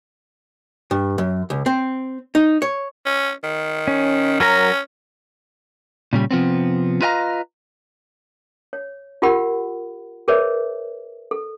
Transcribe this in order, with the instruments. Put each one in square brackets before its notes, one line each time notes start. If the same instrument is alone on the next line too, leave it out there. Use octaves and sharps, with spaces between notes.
[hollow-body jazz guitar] G2
F#2
C#2
C4
D#4
C#5
[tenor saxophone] C#4
D#3
[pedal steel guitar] C#4
[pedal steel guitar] F#3 A#4 A#5 [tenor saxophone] C#4
[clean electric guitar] A#2 C#3 G3
C3 F3 B3 C4
F4 B4 D#5 F5 G5 A#5
[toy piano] C#5
F4 G4 A#4 F#5 B5
G#4 A#4 B4 C#5 D5 E5
A4